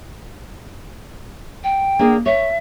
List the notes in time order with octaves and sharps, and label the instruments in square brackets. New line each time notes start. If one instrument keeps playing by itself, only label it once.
[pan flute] G5
[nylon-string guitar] A#3 D4 G#4
[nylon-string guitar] C#5 [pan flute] E5